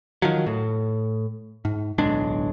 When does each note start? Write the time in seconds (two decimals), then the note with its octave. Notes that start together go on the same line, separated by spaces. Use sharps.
0.22 D#3 F3 F#3
0.46 A2
1.65 G#2
1.98 D1 B1 G#3 D4